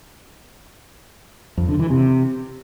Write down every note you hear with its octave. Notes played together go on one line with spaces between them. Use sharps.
F2
D3
E3
C3